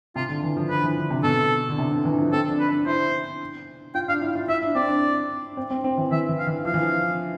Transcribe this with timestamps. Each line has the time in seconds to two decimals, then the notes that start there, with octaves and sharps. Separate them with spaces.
0.16 C3 F4
0.29 D3
0.43 E3
0.57 F3
0.70 F3 B4
0.83 E3
0.97 D3
1.10 C3
1.23 B2 A4
1.69 D3
1.78 C3
1.91 D3
2.05 E3
2.19 F3
2.32 C4 A4
2.50 D4
2.60 B4
2.69 D4
2.87 E4 C5
3.95 F4 G5
4.08 D4 F5
4.22 E4
4.35 F4
4.49 E4 E5
4.62 D4
4.75 C4 D5
4.88 D4
5.57 C4
5.71 C4
5.84 C4
5.97 E3
6.11 E3 E5
6.29 E3
6.39 F5
6.47 E3
6.65 F3 F5
6.74 E3
6.82 F3